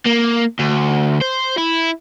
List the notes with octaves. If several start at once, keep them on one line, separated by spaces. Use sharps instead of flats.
A#3
D2
C5
E4